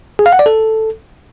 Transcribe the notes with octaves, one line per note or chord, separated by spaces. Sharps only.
G#4
F5
F#5
D5
A4